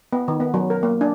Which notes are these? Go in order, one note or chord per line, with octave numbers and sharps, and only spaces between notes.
B3
D#3
B3
F#3
A#4
A#3
D4